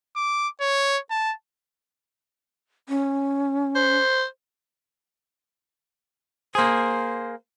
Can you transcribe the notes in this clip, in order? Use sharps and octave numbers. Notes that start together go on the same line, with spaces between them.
D6
C#5
A5
C#4
C5
A#3 G#4 C5